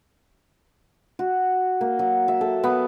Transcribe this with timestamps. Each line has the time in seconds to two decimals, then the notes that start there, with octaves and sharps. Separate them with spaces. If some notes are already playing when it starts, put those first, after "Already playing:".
1.19 F#4
1.81 A#3
1.99 F#3
2.28 E5
2.41 A4
2.63 B3